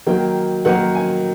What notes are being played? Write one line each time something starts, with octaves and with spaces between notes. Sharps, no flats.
D#3 F#3 A#3 G5
D#3 F#3 A#3 F#5
G#5